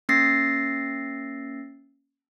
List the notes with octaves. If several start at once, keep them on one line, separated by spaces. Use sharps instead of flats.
A#3 C#4 E6 A6 A#6 C7